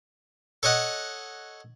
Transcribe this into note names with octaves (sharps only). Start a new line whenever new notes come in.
A4 C#5 D#5 F#5